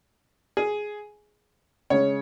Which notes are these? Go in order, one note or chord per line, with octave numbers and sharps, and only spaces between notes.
G#4
C#3 G#3 C#4 C#5